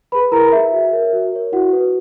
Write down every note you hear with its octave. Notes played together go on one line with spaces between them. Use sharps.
G#4 B4 B5
E4 A#4 A#5
G#4 B4 E5
F#4
A#4 C#5
F#4
A#4 C#5
E4 F#4 F#5
B4